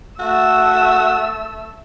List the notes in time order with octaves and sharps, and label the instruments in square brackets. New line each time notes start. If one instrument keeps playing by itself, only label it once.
[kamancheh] A3 E6 [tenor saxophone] F#4